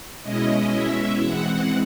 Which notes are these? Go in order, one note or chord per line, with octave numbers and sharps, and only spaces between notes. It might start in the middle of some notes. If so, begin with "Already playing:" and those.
B2 G#3 C#4 E4 D#5
E5
E3 G#3 C4 F#5